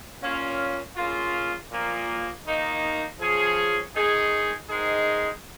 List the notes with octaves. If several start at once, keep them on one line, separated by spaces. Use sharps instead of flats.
A#2 A#3 C#4 F4
C#3 A#3 F4
A#2 F3 A#3
D#3 A#3 D#4
F3 C#4 G#4
D#3 G#3 D#4 G#4
G#2 D#3 G#3 D#4 G#4